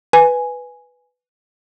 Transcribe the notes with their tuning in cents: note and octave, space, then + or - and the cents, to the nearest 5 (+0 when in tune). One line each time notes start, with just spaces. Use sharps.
B4 +0 G#5 +0